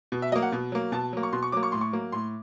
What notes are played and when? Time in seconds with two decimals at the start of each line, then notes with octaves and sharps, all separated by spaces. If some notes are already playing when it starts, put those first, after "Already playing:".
0.12 B2
0.22 E5
0.32 F#3 A#3 D#5
0.42 F#5
0.52 B2
0.72 F#3 A#3
0.92 B2 A5
1.13 F#3 A#3
1.23 C#6
1.33 B2 C6
1.43 C#6
1.52 F#3 A#3 D6
1.63 C#6
1.72 A2 C6
1.81 C#6
1.93 F#3 A#3
2.12 A2 C6